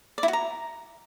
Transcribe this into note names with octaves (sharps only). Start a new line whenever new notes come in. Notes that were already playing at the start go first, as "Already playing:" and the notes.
D5
E4
F#4
A#5